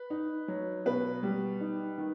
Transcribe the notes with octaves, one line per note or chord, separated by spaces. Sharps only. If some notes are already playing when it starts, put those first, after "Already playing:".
Already playing: B4
D#4
F#3
B2 B4
G3
D#4
D#3